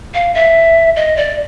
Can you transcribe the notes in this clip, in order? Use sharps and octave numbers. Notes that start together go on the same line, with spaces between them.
F5
E5
D#5
D5